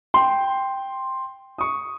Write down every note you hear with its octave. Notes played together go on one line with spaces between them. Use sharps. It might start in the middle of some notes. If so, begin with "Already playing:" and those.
G5 C6
C#6 D#6